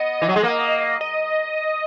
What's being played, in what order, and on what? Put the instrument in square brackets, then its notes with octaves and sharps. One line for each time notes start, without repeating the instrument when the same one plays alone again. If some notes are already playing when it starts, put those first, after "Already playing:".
Already playing: [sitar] B3 [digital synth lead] D#5
[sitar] E3
F#3
G#3
A#3
[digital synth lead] D#5